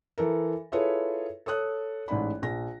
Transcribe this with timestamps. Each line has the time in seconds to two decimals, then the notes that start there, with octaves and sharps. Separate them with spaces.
0.18 E3 A4 A#4
0.72 E4 F4 G#4 A4 B4 C#5
1.46 A4 C#5 D#6 F#6
2.08 A1 G#2 D5 B5
2.42 A#1 A#6